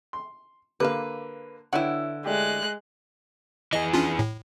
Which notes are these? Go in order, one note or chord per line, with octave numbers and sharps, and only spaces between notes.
C6
D3 A#3 G4 B4 F5
D3 E4 B4 C#5 E5 F#5 G5
G#3 A3 D4 G4 F#6
E3 G#4 D#5
C#4 D4 F4
A2